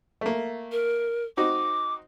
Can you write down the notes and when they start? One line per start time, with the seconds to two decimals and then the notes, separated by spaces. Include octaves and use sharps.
0.21 A3 A#3
0.72 A#4
1.37 C4 D#4 F#4 D6